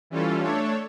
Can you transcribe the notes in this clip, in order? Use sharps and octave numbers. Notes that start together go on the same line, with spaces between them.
E3 G3 C#4 F4 A4
A3 D4 A4 C#5